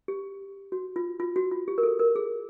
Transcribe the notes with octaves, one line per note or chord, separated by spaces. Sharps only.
G4
F#4
F4
F4
F#4
F4
G4
A#4
A4
A#4
G#4